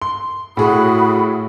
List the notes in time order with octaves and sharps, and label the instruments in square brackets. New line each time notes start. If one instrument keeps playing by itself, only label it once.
[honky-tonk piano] C6
[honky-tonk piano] A2 G#4 [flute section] F#4 B5 D#6